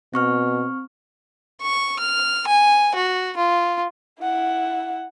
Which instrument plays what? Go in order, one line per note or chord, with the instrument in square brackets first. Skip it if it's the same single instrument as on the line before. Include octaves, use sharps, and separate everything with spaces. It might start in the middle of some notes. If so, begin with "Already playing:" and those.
[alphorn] B2 [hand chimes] C4 C#6 F6
[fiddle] C#6
F6
G#5
F#4
F4
[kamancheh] E4 F#5